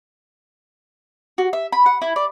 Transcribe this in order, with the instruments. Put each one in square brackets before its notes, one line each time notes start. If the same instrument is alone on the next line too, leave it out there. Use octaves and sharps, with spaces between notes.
[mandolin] F#4
E5
B5
F#5
E4
D5